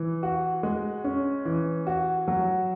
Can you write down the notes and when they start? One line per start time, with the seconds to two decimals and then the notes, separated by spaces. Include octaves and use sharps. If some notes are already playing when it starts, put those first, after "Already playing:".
Already playing: E3
0.23 F#4
0.63 G#3
1.04 C#4
1.45 E3
1.87 F#4
2.28 F#3